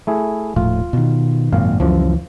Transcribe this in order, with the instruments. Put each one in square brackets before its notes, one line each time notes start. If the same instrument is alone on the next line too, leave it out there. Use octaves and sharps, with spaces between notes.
[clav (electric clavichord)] A3 E4 G#4
[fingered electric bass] D#1 A2 F3 [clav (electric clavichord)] F4
[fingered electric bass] B2 D#3
[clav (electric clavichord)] G#1 F5 [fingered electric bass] F#2 A#2
[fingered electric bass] C#2 E3 [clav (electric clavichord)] F#2 F3